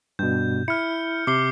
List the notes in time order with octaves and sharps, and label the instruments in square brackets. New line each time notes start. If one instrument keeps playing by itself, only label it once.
[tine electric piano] G2 B2 [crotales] G6
[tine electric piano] E4 [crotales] F6 C#7
[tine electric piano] C3 [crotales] D6 C7 G7